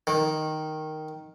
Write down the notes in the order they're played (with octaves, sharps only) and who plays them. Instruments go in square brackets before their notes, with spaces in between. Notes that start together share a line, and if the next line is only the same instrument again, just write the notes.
[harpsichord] D#3